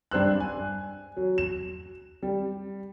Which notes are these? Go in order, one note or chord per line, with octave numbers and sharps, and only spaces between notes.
G2 D4 C5 E6 F#6
G#5
F#3
E7
G3